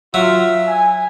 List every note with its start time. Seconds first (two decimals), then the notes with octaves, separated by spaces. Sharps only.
0.14 F#3 F4 E5
0.68 G#5